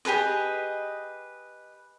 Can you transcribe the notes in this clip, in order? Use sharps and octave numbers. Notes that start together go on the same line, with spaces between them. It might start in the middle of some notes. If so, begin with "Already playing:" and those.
G4 G#4 B4 D#5